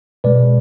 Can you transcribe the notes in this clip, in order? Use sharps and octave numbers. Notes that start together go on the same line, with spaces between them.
B2 G#3 B4 D5